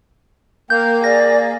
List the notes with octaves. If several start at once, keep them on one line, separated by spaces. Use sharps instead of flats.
A#3 A#4 G5 G6
G#4 D5 A#6